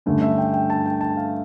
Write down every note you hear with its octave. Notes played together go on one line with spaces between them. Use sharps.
G2 D3 A3 C#4
E5
G5
G5
A5
G5
A5
F5